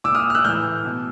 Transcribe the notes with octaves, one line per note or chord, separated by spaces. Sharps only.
A#2 D6 E6
D#6 F6
F6
E6 F#6
A2 E3 F6 G6
B2